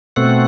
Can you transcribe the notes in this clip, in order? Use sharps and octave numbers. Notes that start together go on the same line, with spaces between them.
B2 A3 C4 F#5